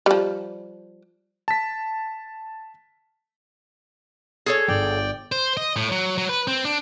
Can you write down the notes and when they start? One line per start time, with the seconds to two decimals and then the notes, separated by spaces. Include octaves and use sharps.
0.06 F3 G3
1.48 A5 B6
4.46 G#4 A4 C#5
4.68 G1 D5 G5
5.32 C5
5.57 D#5
5.76 A2
5.92 F#3
6.18 F#3
6.29 B4
6.48 C4
6.65 D4